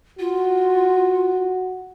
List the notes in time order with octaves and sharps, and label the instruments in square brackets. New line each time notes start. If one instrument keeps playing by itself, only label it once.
[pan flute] F4 [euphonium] F#4